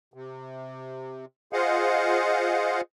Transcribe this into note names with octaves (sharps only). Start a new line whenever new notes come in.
C3
F4 G#4 C5 D#5 F5 F#5